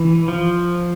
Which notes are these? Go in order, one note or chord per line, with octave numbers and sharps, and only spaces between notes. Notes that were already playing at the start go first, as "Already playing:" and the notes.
Already playing: E3
F3